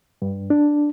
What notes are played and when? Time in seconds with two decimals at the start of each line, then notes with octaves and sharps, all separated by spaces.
0.22 G2
0.50 D4